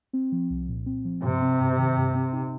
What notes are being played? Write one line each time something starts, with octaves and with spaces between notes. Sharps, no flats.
C4
F3
C2
A#2
C4
F3
G2 C3
C4
G2
D#3
G2
C4
D#4